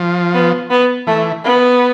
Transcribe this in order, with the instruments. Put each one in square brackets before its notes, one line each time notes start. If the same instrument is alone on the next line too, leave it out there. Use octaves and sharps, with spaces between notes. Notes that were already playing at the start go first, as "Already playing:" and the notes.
Already playing: [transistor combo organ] F3
[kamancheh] B3
B3
[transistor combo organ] E3 [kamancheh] A3
[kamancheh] B3